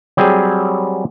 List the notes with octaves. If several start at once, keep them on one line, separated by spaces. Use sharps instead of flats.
F#3 G3 C4 G#4